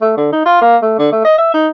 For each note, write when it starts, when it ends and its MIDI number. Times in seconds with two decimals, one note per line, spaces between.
0.01 0.13 57
0.17 0.30 50
0.32 0.42 63
0.45 0.58 65
0.61 0.76 58
0.82 0.94 57
0.99 1.10 50
1.12 1.20 57
1.24 1.36 75
1.38 1.53 76
1.54 1.68 63